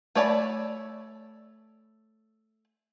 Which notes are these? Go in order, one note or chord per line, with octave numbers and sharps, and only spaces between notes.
A3 C#5 D5 A5 B5